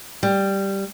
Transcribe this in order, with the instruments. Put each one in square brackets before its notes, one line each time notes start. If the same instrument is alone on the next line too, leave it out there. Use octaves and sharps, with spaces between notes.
[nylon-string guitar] G3